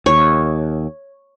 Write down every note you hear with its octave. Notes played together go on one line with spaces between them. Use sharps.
D#2 C#5